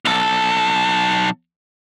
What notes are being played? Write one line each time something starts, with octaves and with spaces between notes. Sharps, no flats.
B1 A4